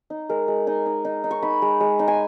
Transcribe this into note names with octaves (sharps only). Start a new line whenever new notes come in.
D#4
G#3 A#4
G#3
D#4 G#5
D#4
D#4
D#4
C#6
D#4 B5
G#3
G#3
D#4
G#5